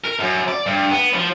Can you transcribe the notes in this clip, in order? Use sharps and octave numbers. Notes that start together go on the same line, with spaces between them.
A#4
F#2
D5
G2
B3
F3